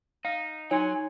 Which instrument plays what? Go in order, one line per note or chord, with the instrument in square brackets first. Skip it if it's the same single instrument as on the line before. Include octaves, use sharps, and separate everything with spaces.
[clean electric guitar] D#4 [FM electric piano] F5
[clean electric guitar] F#3 [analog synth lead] D#4 [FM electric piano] C#5 C6 [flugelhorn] G#5